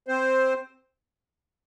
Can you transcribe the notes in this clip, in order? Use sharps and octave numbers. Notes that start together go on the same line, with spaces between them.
C4 C5